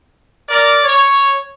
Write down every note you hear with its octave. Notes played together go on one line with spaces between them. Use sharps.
A#4 D5
C#5